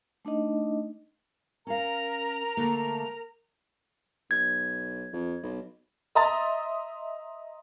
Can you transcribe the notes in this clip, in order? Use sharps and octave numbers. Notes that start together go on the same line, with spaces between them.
A3 D4 D#4 D#5
C#4 A#4 F5 A#5
D3 A3 A#3
B1 G#6
F2
B1
D#5 E5 A#5 C6 D#6 A6